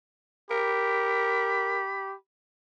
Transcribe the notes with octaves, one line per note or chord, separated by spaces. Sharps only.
G4 A#4 B5